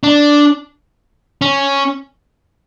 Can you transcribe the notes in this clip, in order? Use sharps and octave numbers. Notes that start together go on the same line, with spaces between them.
D4
C#4